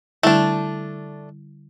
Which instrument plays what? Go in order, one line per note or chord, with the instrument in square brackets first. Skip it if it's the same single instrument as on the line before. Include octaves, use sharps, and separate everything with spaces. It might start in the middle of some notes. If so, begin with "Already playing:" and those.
[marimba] D3 G3 E4 [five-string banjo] A3 D4